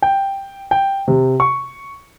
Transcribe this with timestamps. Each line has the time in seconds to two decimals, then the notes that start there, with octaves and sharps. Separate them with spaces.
0.02 G5
0.71 G5
1.08 C3
1.40 C#6